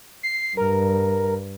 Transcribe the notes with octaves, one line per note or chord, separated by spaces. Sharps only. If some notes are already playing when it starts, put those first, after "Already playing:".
C7
G2 A#4